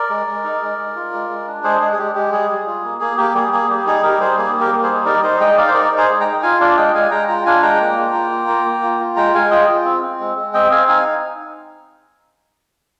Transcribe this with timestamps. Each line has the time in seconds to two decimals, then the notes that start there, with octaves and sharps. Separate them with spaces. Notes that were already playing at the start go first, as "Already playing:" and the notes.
Already playing: A#4 D5
0.10 G#3
0.27 G#3
0.44 D#4
0.61 G#3
0.78 G#3
0.96 F4
1.13 G#3
1.29 G#3
1.47 D4
1.63 G#3 G#4 C5
1.81 G#3 G#4
1.93 G#4
1.99 G#3 G4
2.15 G#3 G4
2.32 G3 G#4
2.49 G3
2.66 F4
2.84 A#3
3.00 A#3 G#4
3.17 A#3 G4
3.34 G3 G#4
3.53 A#3 G#4
3.69 G3 G4
3.87 D#4 G#4
4.03 G3 G4 A#4
4.20 G3 G#4 C5
4.38 A#3 G#4
4.55 A#3
4.60 G4 A#4
4.73 G3
4.83 G#4 C5
4.89 D#4
5.06 D#4 A#4 D5
5.23 D#4 C5 D#5
5.40 G#3 D#5 G5
5.57 D#4 D5 F5
5.68 C5
5.74 D#4 A#4 D5
5.92 D#4
5.97 G#4 C5
6.09 G#3
6.21 G5 A#5
6.26 D#4
6.43 F4 F5 G#5
6.60 D4 D5 F5
6.77 G#3 D#5 G5
6.94 G#3 F5 G#5
7.11 G#3 G5 A#5
7.28 F4 G5 A#5
7.46 D4 F5 G#5
7.62 G#3 G5 A#5
7.81 A#3
7.97 F4
8.14 A#3
8.31 F4
8.48 A#3
8.65 A#3
8.83 F4
9.00 F4
9.16 G#3 G5 A#5
9.35 G#3 F5 G#5
9.51 F4 D#5 G5
9.69 F4
9.85 C4
10.03 C4
10.20 G#3
10.36 G#3
10.54 C4 D#5 G5
10.70 C4 F5 G#5
10.88 D#4 F5 G#5